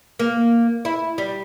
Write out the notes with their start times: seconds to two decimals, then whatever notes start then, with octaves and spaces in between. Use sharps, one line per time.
0.20 A#3
0.85 E4
1.18 G3